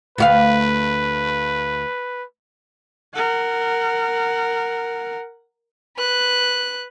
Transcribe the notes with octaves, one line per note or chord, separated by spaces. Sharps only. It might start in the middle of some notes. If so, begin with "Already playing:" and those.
D2 F#4 B4 F5
A#4 F#5
B4 F#6